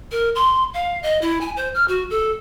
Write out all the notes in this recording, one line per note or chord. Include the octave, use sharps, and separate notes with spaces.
A#4
C6
F5
D#5
E4
G#5
C5
F6
F#4
A4